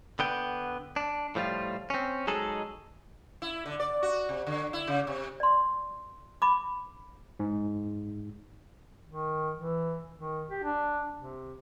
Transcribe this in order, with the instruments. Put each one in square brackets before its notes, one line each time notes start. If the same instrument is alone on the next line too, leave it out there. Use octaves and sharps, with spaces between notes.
[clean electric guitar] D3 B3 G5
D4
A2 F3 G3 F4
C4 C#4
F#3 G#3 D#4 G#4 A4
[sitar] E4
D3
D5
F#4
C3
D3
E4
C#3
C3
[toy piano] D5 C6
B5 D6
[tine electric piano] G#2
[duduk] D#3
E3
D#3
G4
D4
C3